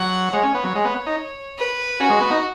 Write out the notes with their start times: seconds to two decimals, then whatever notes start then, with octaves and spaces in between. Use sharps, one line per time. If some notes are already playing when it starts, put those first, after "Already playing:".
Already playing: F#3 F#5
0.33 G#3 C#5
0.43 C#4
0.55 B3
0.64 F#3
0.75 G#3
0.85 B3
1.07 D#4
1.59 B4
2.00 C#4 F#4
2.10 G#3
2.21 B3
2.31 D#4